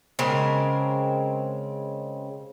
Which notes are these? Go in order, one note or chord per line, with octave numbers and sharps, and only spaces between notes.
C#3 G#3 C4 A#4